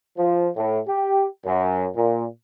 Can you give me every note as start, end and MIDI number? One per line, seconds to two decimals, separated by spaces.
0.17 0.47 53
0.56 0.79 45
0.88 1.26 67
1.46 1.86 42
1.96 2.25 46